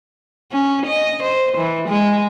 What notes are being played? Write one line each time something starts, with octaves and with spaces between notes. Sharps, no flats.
C#4
D#5
C5
E3
G#3